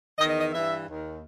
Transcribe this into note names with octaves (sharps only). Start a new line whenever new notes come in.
E2 D#3 D#5
D#5
D#5
G2 E3 E5
D#2 D#3